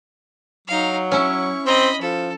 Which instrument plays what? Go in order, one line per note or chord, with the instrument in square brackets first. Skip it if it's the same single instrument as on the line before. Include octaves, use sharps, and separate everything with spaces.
[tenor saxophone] F#3 [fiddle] D#4 F5
[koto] C#4 E4 [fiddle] C#6
[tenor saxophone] C4 [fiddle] D#5 B5
[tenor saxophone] F3 [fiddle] A4